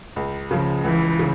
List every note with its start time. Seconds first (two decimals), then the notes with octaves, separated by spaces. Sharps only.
0.16 C#2
0.51 C#3 F3
0.84 C#2 E3
1.19 C#3